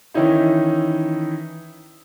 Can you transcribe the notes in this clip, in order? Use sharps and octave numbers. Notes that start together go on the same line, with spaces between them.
D#3 E3 C#4 D#4 E4